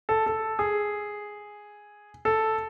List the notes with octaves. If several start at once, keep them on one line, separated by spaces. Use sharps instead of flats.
A4
A4
G#4
A4